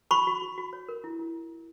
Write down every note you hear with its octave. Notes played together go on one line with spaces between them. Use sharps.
F#4 B5 C#6
F#4
F#4
F#4
C#5
A#4
E4
E4